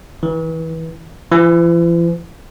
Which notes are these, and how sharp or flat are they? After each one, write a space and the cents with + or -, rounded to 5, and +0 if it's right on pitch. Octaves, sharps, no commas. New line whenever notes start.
E3 -25
E3 +45